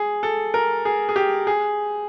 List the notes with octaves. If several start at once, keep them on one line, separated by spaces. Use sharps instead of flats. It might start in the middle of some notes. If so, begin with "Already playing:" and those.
Already playing: G#4
A4
A#4
G#4
G#4
G4
G#4